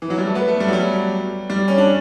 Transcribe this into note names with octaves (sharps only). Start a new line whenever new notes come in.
E3
F#3
G3
A3
B3
A3
G3
F#3
G3
G3
C#4
D4